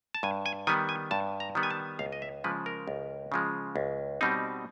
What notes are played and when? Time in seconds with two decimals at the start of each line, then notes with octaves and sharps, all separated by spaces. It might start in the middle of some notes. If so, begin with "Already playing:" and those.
0.14 A5
0.23 G2 G#5
0.46 G#5
0.67 D#3 G3 B3 G#5
0.89 G#5
1.11 G2 A5
1.40 A#5
1.55 D#3 G3 B3
1.63 G#5
1.70 A5
1.99 C#2 F5
2.12 D#5
2.22 E5
2.44 C#3 F3 G#3 B4
2.66 A#4
2.88 C#2
3.32 C#3 F3 G#3
3.76 C#2
4.21 B2 G3 C4 D#4